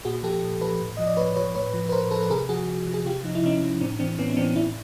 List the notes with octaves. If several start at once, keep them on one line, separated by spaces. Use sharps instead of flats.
A#2 F#4 G#4
F3 G4 A4
A#2
F3 A4 B4
A2
F3 D#5
D5
A2 B4 C#5
F3 B4 C#5
A2 B4 C#5
F3
B4
A2 A#4 C5
F3 A4 B4
A4
C3 G#4 A#4
F3 F#4 G#4
C3
F3
G#4
C3 F4 G4
F3 D#4
E4
C3 C#4 D#4
F3
A2 C4 D4
E3 C4 D4
A2 B3 C#4
D#4
E3 C4 D4
A2 D4 E4